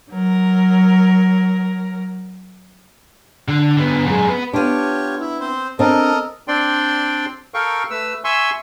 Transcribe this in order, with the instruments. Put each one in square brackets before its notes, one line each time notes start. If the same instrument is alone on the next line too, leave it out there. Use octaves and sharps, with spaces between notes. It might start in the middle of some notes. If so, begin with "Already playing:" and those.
[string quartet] F#3 A#4
[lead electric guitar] D3
D3 B3
F#2 G#3
B3 B4
[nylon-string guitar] B3 D4 [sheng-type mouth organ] F4 G4 C#5
[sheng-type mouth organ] E4
C4 C5
[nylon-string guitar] C4 D4 [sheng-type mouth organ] A4 A#4 D#5
[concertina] C4 D4 D5 G5 C6
A4 A#4 F5 G5 C#6
A3 B4 E6
E5 G#5 C6 C#6 E6